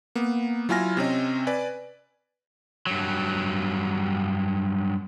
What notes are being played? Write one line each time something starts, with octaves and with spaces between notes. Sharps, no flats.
A#3 B3
F#3 E4 F4 G#5 F6 A#6
C3 C4 C#4 D#5
B4 D5 G#5
G2 F#3